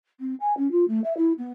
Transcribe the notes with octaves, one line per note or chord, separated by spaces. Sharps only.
C4
G#5
C#4
F4
A3
E5
E4
B3